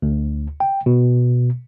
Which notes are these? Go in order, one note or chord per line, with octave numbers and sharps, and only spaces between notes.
D2
G5
B2